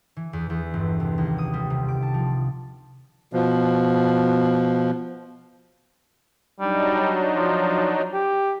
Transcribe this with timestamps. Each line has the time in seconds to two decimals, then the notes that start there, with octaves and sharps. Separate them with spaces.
0.16 E3
0.33 E2
0.50 E2
0.74 G1
1.00 C2
1.18 D#2
1.38 D#6
1.53 G3
1.70 C3
1.88 D6
2.02 A5
2.14 F3
3.33 B2 F3
6.60 F#3 G3 D4 D#4
7.36 F3
8.13 G4